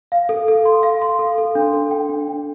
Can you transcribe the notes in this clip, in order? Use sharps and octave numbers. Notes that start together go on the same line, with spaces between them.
F5
A4
A4
C6
F5
C6
A4
A4
D4
A4
G5
D4
D4